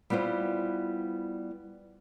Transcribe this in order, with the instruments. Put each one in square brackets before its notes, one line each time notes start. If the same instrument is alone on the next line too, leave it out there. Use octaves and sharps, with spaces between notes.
[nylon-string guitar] G3 B3 E4 F4 C5